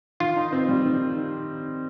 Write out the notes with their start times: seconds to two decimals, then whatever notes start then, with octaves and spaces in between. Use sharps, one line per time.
0.20 D#3 F4
0.36 D#4
0.53 C4
0.69 G3
0.85 D#3